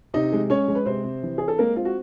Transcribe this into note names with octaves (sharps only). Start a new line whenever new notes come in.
C3 D#4 D#5
G#3
G#3 C#4 C#5
G#3
B4
C3 C4 C5
C3
E3
C4 G#4
A4
G#3 A#3 A#4
C4 F4
F#4